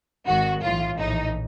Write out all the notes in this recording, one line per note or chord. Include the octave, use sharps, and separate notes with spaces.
G#1 G#2 D#3 F#4
B1 A2 E3 F4
A#1 A2 E3 D#4